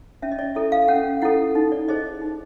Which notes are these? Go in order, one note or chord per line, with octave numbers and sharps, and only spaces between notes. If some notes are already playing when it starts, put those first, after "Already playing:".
C#4 E5
D#5
D5
E4 A4 E5
F5
C#4 F#5
E4 A4 F#5
D#4
D5
G#4 C5 D#5
D#4